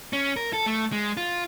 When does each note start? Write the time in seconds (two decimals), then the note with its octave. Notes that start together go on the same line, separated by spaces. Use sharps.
0.13 C#4
0.36 A#4
0.53 A4
0.66 A3
0.92 G#3
1.17 F4